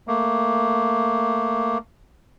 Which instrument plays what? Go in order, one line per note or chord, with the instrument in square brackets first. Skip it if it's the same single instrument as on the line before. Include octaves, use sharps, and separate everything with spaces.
[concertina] A3 A#3